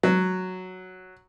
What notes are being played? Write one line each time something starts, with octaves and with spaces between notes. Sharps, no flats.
F#3